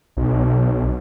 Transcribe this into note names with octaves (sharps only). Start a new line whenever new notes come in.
B1